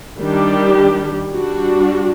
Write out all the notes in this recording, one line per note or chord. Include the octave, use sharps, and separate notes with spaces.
D#3 G3 D4 G4
G3 D4 F#4